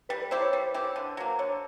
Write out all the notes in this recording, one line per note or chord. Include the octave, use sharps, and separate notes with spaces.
G3 B4
B4
C4 E4 G4 C5
C#5
G3 C5
C4 E4 G4
D3
F#3 A#3
D3 C#5